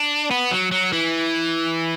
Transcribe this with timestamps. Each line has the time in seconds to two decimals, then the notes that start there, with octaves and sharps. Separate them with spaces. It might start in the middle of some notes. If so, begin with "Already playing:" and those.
Already playing: D4
0.31 B3
0.51 F#3
0.71 F#3
0.93 E3